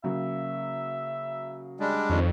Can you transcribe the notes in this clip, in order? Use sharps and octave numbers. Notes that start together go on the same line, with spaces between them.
C#3 F#3 A#3 E5
G3 G#3 D4
F2 D#3 C#5